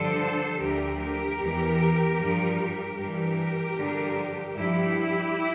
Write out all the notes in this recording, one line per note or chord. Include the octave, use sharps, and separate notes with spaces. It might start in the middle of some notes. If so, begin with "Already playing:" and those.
Already playing: G2 D3 F3 A4 C5
D2 D3 F3 G4 A#4
G4 A#4
E2 E3
G2 F3
G2 E3 G4 A#4
G2 D3 F3
G2 F3 E4 G4